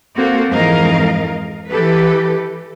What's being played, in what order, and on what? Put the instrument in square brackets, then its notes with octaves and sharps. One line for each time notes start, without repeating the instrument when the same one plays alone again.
[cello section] A#3 C4 F#4 A4
F2 G#2 E3 A#4 D#5 F5
E3 G4 A4 B4